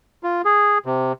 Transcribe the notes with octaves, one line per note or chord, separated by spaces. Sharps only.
F4
G#4
C3